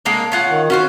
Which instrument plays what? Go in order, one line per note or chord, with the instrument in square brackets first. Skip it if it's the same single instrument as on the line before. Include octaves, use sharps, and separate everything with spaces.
[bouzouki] G#3 A#3 D4
C#4 F4 F#5
[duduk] D#3
[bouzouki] C#4 F4 C5 [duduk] F#4